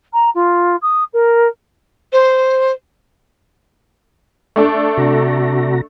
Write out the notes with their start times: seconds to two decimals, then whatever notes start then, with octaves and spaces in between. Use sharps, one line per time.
0.13 A#5
0.35 F4
0.82 D#6
1.14 A#4
2.13 C5
4.56 A3 D4 A4
4.97 C3 F#4 A#5